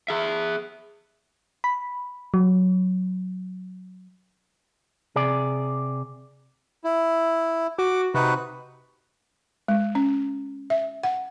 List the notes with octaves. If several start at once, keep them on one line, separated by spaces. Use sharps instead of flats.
G#4 E5
B5
F#3
C3 G#4 D5
E4
F#4 D6
C3 D#4 F#4 B4
G#3
C#4
E5
F#5